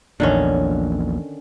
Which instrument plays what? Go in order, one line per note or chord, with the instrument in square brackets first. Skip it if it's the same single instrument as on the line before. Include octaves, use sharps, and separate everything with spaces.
[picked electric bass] A#1 E2 A#2 [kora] D3 D#3 C#4